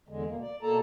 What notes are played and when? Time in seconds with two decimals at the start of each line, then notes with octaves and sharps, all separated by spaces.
0.08 E2 D3 G#3
0.27 B2 A#3
0.41 D5
0.62 B2 A#3 A4 A5 A#5